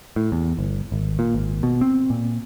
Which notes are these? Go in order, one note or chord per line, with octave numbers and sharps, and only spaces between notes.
A2
E2
G1
G#1
A#2
G#1
B2
C4
A#2